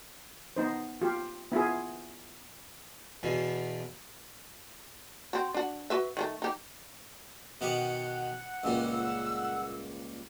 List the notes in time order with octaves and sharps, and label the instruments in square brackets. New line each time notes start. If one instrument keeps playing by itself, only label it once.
[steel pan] B3 D#4 C5
F4 G4
B3 E4 F4 G#4
[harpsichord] E2 B2
[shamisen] C4 F#4
D4 F#4
F#4 B4 E5
D#3 G3 A3
D#4 G4
[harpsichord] B2 D#3 G4 [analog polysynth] F#5
[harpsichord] C#2 A#2 G3 [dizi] E6